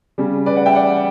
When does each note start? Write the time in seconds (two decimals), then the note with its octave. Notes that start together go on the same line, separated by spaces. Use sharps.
0.18 C#3 G3
0.46 B4 D5
0.56 D5 F#5
0.66 E5 G5
0.75 D5 F#5